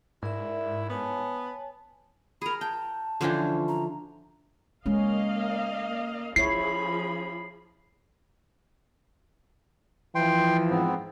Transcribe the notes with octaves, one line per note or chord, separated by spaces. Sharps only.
G#2 E4 A#4 D5 E5
B3 C#5 G#5 A5
G#4 A#4 B5
G5 A5
D3 E3 F3 C#4 D4 C5
A#5
G#3 A#3 C#4 D#5 F5
F3 C#4 E4 G#4 C#5 B5 C7
E3 F3 G5 C6
G#2 B3 C4